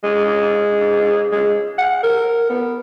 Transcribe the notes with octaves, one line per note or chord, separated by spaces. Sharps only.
G#3
G#3
F#5
A#4
B3